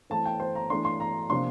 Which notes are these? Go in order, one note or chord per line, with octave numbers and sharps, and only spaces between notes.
E3 A3 C4 A5
G5
C5
A#5
E3 A3 D4 C6
C6
A#5
C3 F3 A#3 D4 C6